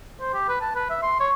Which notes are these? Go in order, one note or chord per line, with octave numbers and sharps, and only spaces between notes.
C5
G4
B4
A5
B4
E5
C6
C#5